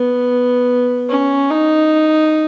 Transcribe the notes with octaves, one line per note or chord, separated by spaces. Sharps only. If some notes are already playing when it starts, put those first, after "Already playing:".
Already playing: B3
C#4
D#4